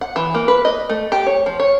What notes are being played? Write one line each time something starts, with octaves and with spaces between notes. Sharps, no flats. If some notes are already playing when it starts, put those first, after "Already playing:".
F#5
E3
A#3
B4
D#5
A3
G4
C#5
F3
C#5